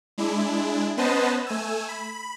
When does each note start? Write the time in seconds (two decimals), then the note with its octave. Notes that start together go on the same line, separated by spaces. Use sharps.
0.18 G#3 D4 E4
0.97 B3 C#4 B4 C5 D#5 A5
1.46 A3 G#5 E6
1.89 B5